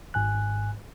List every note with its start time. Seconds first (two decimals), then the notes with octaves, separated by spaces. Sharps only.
0.14 G#1 G#2 G#5 F#6